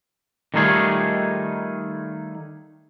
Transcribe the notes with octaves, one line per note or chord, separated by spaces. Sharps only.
D#3 G3 A3 D#4 F4 G#4